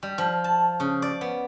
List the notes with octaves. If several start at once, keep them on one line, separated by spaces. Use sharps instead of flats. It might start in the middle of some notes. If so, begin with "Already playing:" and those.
G3
F3
A5
C#3
D5
B3